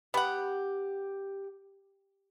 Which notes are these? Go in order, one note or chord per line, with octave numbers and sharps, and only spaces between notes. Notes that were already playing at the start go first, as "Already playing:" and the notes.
B3 G4 F#5